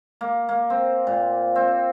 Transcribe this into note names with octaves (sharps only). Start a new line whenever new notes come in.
A#3
A#3
C4
A#2
C4